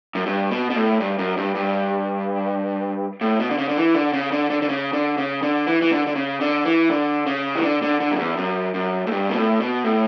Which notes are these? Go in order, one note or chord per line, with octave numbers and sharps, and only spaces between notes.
F#2
G2
B2
B2
A2
G2
F#2
G2
G2
A2
B2
D3
C#3
D3
E3
D3
C#3
D3
D3
D3
C#3
D3
C#3
D3
E3
E3
D3
D3
C#3
D3
E3
D3
C#3
E3
D3
D3
D3
F#2
E2
F#2
F#2
A2
G2
B2
A2
B2
A2